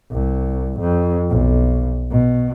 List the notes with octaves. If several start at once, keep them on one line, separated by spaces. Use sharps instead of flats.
C2
F2
B1
B2